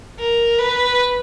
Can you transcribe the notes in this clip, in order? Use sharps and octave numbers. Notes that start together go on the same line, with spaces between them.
A#4
B4